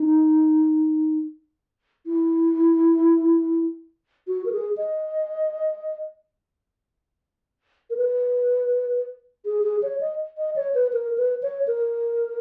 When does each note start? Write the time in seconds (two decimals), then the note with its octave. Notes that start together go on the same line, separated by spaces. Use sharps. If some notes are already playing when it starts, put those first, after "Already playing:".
Already playing: D#4
2.06 E4
4.28 F#4
4.45 A#4
4.52 G#4
4.77 D#5
7.90 A#4
7.97 B4
9.45 G#4
9.64 G#4
9.82 C#5
10.01 D#5
10.38 D#5
10.56 C#5
10.74 B4
10.93 A#4
11.18 B4
11.43 C#5
11.67 A#4